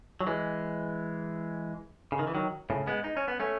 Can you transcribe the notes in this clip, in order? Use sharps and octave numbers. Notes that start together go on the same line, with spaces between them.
F#3
E3 G#3
C#3
D#3
E3
D#3 F#3
A2 C#3
G#3 B3
D#4
C#4
B3
A3 C#4